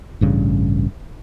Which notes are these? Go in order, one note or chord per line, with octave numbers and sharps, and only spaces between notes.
A1 G2 C#3